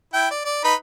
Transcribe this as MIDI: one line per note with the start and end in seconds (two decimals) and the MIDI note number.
0.14 0.27 64
0.14 0.27 79
0.31 0.44 74
0.45 0.60 74
0.64 0.74 63
0.64 0.74 71
0.64 0.74 83